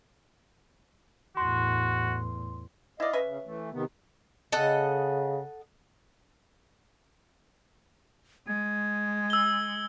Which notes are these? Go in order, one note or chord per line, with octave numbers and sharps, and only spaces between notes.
E2 A2 F#4 C6
E4 D5 D#5 F5
C#4 B4 E5
C#3
E3 A3
C3 D#3 B3
C#3 A4 D#5 F#5
G#3 G#6
E6 G7